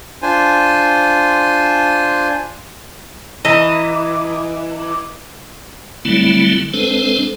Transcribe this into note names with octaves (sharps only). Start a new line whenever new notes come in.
D4 F4 C5 G#5
E3 D#5 A#5
D3 F#3 G3 A3 C4 E4
G#3 C4 D4 A4 B4 C5